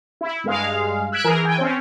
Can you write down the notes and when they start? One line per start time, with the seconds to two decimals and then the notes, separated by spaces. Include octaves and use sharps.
0.21 E4
0.44 G2 G#3 F5
1.12 E6 F#6 G#6 B6 D7
1.24 E3 G#4 A#4
1.44 E3 G5 G#5
1.58 C4 C#4